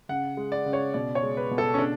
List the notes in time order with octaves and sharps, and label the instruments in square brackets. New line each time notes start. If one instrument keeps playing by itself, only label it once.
[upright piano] C#3 F#5
G#3
D5
C#3
C#5
B2 D5
C#5
G#3
B4
B2
A4
C#4
C#3 D4